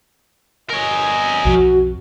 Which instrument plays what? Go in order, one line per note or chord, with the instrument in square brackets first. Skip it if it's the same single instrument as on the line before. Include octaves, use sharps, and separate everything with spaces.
[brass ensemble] G1 D#5 G#5 [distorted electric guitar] A#4 C#5
[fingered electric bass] B1 F2 [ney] F#4